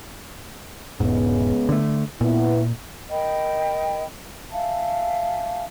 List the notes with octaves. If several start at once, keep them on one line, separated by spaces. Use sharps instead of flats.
E1 G#2 C#3 G#3 B3
D3 A3
A#2 B3 E4
A#4 D#5 G5 B5
E5 F5 G#5 A5